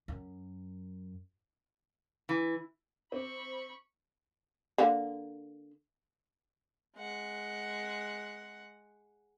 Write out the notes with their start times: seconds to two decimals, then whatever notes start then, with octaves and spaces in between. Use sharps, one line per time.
0.08 F#2
2.29 E3
3.12 C4 B5 C#6 D6
4.78 D3 A#3
6.97 G#3 F#5